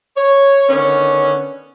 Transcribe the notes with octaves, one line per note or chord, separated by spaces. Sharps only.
C#5
D3 D#3 B3 C#4